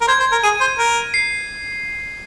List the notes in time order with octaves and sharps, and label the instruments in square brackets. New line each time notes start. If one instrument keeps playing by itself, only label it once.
[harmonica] A#4
[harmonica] C5 [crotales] G#6
[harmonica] C5
A#4
[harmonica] G#4 [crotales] D#7
[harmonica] C5
A#4
[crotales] C7